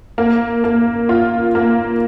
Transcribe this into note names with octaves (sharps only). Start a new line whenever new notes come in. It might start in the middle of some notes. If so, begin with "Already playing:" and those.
A#3
A#3
F4
A#3